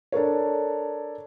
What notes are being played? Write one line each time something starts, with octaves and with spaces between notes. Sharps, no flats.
D4 A4 A#4 C#5